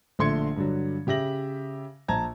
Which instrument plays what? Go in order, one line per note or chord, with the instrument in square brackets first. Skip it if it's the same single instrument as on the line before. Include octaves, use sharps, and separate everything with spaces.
[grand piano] A#1 D3 A3 C6 G#6 C#7
G2 D3 F#3
C#3 G4 E5 A#6 F#7
A#1 A5 A#5 G#6